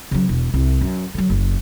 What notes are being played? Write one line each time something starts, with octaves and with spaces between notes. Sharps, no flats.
C#3 F#3
E1
C2
F#2
D3 F#3
F#1